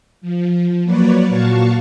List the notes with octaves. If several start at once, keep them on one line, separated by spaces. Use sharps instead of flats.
F3
F#3 A#3 B4 C#5 D5
A#2 A#3 F#4 F5 A5 C#6